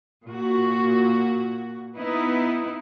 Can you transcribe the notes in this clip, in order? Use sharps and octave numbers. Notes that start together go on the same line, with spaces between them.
A#2 F#4
B3 D#4 E4